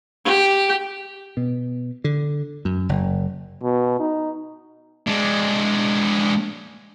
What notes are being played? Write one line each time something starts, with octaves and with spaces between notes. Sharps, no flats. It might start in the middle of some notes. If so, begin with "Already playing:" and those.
G4
B2
D3
F#2
F#1
B2
D#4
G#3 D4